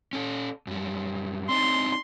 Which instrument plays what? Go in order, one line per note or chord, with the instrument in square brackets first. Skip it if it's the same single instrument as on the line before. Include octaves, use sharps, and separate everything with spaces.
[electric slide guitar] C#4 A4
F#2 G3
[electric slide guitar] C4 D4 D#4 [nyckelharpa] C6